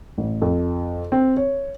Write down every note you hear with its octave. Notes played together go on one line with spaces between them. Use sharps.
A1
F2
C4
C#5